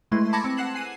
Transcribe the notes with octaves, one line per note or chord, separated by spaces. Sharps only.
G#3 A3 E4 B4 C6
A5 B5 D6 G#6 A#6 C#7
C4
F#5 F#6 C7 E7 F#7
G#5 C7 D#7